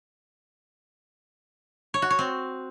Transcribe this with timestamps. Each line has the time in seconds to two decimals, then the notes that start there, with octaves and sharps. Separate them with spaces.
1.94 C#5
2.02 F#4
2.10 C#5
2.19 C4